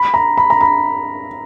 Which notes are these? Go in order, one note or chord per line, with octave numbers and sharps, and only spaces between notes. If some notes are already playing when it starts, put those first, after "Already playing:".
Already playing: B5
A#5
B5
A#5
B5